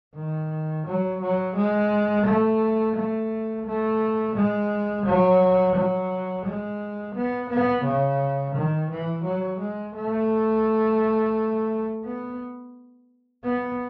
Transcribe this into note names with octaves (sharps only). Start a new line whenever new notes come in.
D#3
F#3
F#3
G#3
A3
A3
A3
G#3
F#3
F#3
G#3
B3
B3
C#3
D#3
E3
F#3
G#3
A3
B3
B3